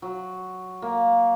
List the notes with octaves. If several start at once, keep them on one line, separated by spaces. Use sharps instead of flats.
F#3
A#3